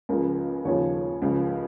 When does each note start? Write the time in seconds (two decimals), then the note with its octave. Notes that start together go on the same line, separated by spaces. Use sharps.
0.09 C#2 C#3 F3 A#4
0.65 D#2 C#3 F3 C#5
1.22 C#2 C#3 F3